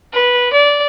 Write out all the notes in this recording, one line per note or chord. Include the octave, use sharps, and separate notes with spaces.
B4
D5